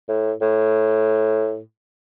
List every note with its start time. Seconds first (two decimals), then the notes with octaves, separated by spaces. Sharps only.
0.09 A2
0.42 A2